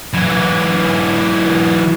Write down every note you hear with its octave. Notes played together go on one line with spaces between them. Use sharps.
E3 F#3